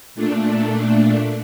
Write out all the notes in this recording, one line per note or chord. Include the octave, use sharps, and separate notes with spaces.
A#2 A3 D4